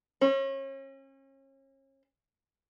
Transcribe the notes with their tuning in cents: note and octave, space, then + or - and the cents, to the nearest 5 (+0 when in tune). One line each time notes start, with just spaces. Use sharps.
C#4 -35